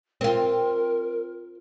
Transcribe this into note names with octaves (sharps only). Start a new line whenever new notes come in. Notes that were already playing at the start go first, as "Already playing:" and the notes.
C4 F4 A#4